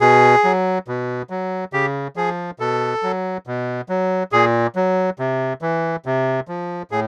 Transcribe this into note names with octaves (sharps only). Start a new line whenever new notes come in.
B2 G#4
F#3
B2
F#3
C#3 G4
F3 G#4
B2 A4
F#3
B2
F#3
A#2 G#4
F#3
C3
E3
C3
F3
A2 G#4